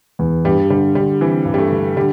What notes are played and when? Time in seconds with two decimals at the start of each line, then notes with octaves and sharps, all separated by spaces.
0.19 E2
0.45 G2 G3
0.70 D3 G3
0.95 D3 G3
1.21 E3 C4
1.45 G2
1.54 G3
1.58 A3
1.71 D3
1.96 D3 G3